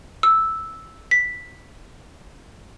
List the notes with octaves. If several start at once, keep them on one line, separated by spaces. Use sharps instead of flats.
E6
B6